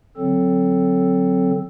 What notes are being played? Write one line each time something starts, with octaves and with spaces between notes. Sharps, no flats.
D3 F#3 C4 A4